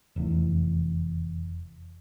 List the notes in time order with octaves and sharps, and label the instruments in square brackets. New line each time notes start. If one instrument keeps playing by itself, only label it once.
[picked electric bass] F1 E2